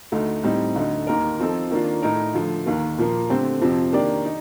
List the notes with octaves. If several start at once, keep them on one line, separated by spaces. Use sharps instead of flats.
D2 D3 A3 D#4
A2 G3 C4 D#4
D2 D3 A3 D#4
D#2 D#3 A#3 D#4 A#4
F3 C4 D#4 A4
D#3 A#3 D4 F4
A2 A3 D#4 A#4
D3 F3 A3
D#2 D#3 A#3
A#2 F3 A#3
D3 A3 C4 G4 C5
F2 C3 F3 C4 G4
D#3 A#3 D4 G4 D5
D#4